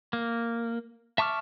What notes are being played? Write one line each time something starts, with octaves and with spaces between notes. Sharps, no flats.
A#3
E5 A5 C#6 D6 F6